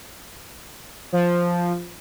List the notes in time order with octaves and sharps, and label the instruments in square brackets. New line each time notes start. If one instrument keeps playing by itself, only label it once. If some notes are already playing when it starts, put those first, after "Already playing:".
[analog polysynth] F3